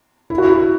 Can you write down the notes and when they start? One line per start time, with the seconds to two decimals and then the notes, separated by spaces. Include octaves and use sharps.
0.30 E4
0.38 F#4
0.44 E4